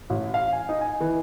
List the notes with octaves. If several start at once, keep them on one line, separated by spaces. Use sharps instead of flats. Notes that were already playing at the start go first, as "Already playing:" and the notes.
A1
F5
G#5
D#4
G#5
E3